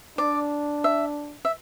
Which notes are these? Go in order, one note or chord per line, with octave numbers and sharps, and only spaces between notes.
D4 D5
E5
E5